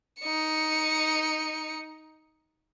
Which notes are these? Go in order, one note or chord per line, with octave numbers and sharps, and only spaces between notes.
D#4 C#7